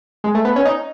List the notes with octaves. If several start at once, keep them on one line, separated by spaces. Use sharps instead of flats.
G#3
A3
B3
C#4
D#4